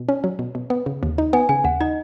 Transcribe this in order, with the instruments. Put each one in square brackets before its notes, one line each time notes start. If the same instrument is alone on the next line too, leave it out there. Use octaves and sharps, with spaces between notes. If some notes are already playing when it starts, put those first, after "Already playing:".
Already playing: [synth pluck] B2
C#4
F#3
B2
B2
B3
C#3
D#2
D#4
[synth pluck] B3 [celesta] G#5
[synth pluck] C#3 [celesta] G#5
[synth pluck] D#2 [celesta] F#5
[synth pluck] D#4 [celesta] D#5